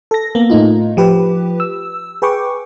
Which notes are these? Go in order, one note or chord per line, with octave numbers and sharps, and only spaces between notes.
A4 A#6
A#3 B3
A2 A3 D#4 F4
F3 G4 B4
E6
G#4 B4 G5 C#6 D6